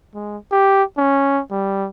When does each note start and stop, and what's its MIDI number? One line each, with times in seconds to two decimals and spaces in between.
0.14 0.37 56
0.51 0.83 67
0.97 1.41 61
1.51 1.88 55